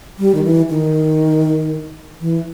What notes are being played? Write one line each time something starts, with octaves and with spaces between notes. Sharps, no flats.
G3
D#3
E3
D#3
E3